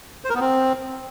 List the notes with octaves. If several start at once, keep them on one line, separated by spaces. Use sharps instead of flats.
C5
A#4
B3
C4